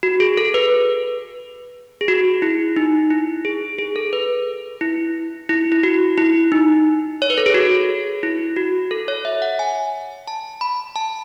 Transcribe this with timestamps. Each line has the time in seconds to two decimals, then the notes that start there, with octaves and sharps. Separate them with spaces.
0.03 F#4
0.20 G#4
0.37 A4
0.54 B4
2.01 G#4
2.08 F#4
2.42 E4
2.76 D#4
3.11 E4
3.45 G#4
3.79 G#4
3.96 A4
4.13 B4
4.81 E4
5.49 E4
5.72 E4
5.83 F#4
6.18 E4
6.52 D#4
7.22 C#5
7.30 B4
7.38 A4
7.46 G#4
7.54 F#4
8.23 E4
8.56 F#4
8.91 A4
9.08 C#5
9.25 E5
9.42 F#5
9.59 G#5
10.28 A5
10.61 B5
10.96 A5